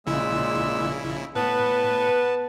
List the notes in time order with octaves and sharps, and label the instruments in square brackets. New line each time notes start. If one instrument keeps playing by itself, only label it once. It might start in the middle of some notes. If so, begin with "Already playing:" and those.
[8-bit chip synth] A#1 C#3 E4 [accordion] A#2 G#3 E6
[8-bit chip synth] A2 [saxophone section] B3 B4 [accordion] A5